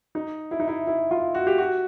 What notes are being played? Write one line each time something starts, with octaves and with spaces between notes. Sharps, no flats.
D#4
E4
D#4
E4
E4
F4
F#4
G4
F#4